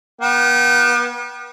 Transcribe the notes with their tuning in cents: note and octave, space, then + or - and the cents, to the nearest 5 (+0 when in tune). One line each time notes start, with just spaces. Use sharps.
B3 -40 G5 -35